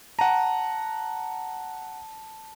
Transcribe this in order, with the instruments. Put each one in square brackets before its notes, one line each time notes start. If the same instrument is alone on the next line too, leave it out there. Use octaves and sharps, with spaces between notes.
[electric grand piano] F#5 A#5 [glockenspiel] A5